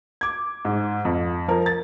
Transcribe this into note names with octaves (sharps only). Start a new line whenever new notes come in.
D6 G#6
G#2
F2
F3 A#4
A6